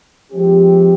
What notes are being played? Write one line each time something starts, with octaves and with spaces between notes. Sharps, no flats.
F3 G#3 C4 G4